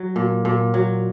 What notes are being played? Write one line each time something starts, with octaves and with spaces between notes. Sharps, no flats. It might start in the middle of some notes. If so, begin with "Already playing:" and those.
Already playing: F#3
A#2
A#2
F#3